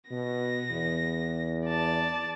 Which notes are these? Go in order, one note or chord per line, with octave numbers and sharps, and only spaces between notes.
B2 B3 A#6
E2
D5 A5